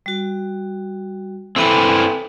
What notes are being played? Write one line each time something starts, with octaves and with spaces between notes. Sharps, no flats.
G3 F#4
C4 E4 A4 B4 G5 G#5